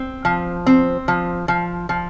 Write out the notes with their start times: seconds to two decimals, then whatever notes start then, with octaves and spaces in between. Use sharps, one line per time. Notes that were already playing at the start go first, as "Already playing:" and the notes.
Already playing: C4
0.25 F3
0.66 C4
1.08 F3
1.48 F3
1.89 F3